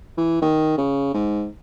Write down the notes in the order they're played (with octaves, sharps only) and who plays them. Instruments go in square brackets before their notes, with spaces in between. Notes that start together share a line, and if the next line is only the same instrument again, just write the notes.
[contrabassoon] E3
D#3
C#3
G#2